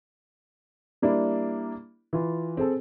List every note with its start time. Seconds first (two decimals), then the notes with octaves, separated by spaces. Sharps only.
1.02 G3 A#3 D4 E4
2.13 E3 F4
2.57 C4 G#4 A4